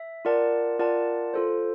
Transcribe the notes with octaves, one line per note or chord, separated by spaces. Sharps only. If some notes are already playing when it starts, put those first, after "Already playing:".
Already playing: E5
F4 A#4 D5 F#5 A5
F4 A#4 D5 F#5 A5
F4 A4 C5